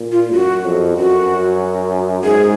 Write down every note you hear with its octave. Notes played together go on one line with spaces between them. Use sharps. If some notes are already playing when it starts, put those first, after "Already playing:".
Already playing: A#2
F4
F#2 F#4
F2
F#2 F#4
G#2 G#4